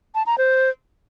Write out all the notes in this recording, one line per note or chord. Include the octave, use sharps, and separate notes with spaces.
A5
A#5
C5